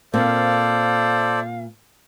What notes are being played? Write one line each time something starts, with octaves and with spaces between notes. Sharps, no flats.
A#2 A#3 C4 A4 C5 D5 F5